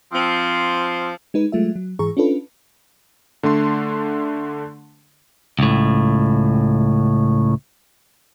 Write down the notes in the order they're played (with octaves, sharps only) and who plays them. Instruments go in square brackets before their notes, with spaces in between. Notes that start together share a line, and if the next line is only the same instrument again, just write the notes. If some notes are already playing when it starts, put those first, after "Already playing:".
[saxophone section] F3 C4
[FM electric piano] G#3 D#4 B4
F#3 G#3 A3 F4 E5
F#3
G#2 E3 G#4 A#5 C#6
C#4 D4 F4 A4 B4
[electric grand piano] D3 A3 D4 C6
[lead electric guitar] C#2 A2